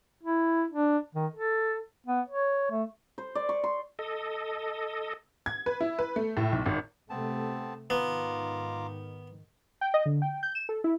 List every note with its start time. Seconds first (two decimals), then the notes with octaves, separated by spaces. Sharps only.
0.23 E4
0.71 D4
1.15 D#3
1.34 A4
2.07 B3
2.28 C#5
2.71 A3
3.18 C5
3.35 D5
3.49 C#6
3.64 C6
3.99 A4 D#5
5.46 G#6
5.66 B4
5.81 E4
5.99 B4
6.16 A3
6.37 A2
6.52 B1
6.66 G#1
7.10 C3 A3 B3 C4 A5
7.90 G#2 D#3 B3 F4 A#5 D6
9.81 G5
9.94 D#5
10.06 D3
10.22 G5
10.43 G6
10.55 E7
10.69 A4
10.84 E4